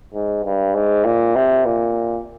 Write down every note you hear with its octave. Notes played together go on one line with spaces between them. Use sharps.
G#2
G2
G#2
A#2
C3
A#2